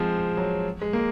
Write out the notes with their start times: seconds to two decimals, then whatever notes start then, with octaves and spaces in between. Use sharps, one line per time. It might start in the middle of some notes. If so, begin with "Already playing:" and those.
Already playing: F3 G#3 C4
0.37 F#3
0.82 G#3
0.93 A#3